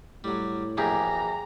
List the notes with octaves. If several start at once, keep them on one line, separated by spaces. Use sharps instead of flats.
A2 F#3 G3
A#1 E2 B2 G4 G#4 A#5